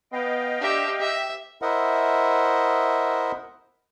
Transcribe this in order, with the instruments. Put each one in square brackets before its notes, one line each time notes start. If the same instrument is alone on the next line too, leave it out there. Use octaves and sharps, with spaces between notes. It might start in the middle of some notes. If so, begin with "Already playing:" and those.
[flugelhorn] B3 [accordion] D#5 F5 G5
[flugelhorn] D4 [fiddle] G4 E5
[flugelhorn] G4 [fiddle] E5
[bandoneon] E4 A#4 C5 D#5 E5 F#5